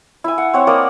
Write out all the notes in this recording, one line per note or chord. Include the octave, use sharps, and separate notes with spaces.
E4 G#5
F#5
C4 C#5 F#5
A#3 D5 D#5